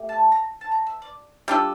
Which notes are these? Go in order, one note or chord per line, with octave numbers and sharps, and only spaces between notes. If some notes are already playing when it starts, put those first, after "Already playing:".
Already playing: A3 G4
A5
A#5
A5
A#5
E5
D5
G3 D4 F4 A4